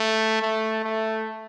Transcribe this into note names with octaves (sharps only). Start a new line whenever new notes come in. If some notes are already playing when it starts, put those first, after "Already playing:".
Already playing: A3
A3
A3